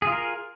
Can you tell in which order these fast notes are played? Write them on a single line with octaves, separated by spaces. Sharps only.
G#4 F4 A#4